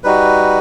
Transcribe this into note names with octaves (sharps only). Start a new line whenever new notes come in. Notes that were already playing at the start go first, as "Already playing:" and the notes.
G3 D#4 F#4 B4